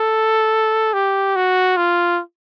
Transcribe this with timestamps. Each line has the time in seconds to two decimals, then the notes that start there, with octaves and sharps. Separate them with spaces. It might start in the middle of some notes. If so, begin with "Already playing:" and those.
Already playing: A4
0.93 G4
1.36 F#4
1.77 F4